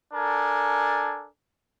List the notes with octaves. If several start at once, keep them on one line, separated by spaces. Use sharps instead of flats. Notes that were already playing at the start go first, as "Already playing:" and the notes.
D4 A4 A#4 G#5